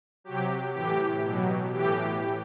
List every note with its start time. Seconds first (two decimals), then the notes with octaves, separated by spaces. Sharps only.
0.24 C3 F#3 G4
0.74 A2 E3 G4
1.23 B2 F#3
1.73 A2 E3 G4